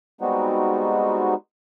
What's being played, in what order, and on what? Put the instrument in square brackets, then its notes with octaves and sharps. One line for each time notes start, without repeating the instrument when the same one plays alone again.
[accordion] G3 G#3 B3 C4 D#4 F#4